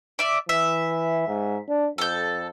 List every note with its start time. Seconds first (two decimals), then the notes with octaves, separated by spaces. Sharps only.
0.19 D5 E5
0.49 E3 E5
1.28 G#2
1.69 D4
1.98 F2 A4 G6